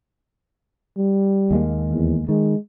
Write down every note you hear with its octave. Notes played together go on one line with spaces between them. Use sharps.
G3
D#2 G#3 A#3
E2
D#3 G#3